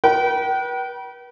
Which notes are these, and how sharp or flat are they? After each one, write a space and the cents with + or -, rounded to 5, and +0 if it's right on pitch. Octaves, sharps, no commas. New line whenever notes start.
B4 -40 G5 -40